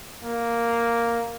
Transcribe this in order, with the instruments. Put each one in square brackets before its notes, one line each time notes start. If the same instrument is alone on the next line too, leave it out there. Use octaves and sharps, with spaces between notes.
[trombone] A#3